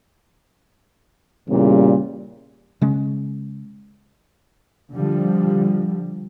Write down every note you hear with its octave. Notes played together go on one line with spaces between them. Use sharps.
E2 A#2 C#3 G3
C#3 G#3 C#4
D3 F3 G3